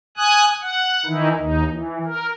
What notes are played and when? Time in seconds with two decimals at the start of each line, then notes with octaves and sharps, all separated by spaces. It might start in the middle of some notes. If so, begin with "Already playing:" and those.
0.17 G#5 D#6 F#6
0.62 F#5
1.06 D#3 E3 D#4 E4
1.39 D#2 D#4
1.69 E3
2.06 A#4